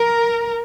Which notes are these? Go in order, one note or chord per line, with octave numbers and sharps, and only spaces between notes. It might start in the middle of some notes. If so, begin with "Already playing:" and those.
Already playing: A#4